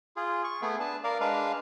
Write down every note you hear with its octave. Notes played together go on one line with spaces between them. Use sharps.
F4 G#4
C#6
A3 B3 G#4
D4 B4 A5
A#4 D5 F5
G#3 D4 B4 F5